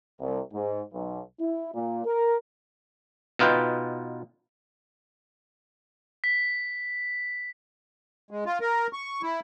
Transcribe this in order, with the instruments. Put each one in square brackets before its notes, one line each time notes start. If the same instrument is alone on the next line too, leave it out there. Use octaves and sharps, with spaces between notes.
[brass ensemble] C2
G#2
B1
E4
A#2
A#4
[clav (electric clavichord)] B2 D#4 F4 B4 G5
[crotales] B6
[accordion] G#3
F4
A#4
C#6
E4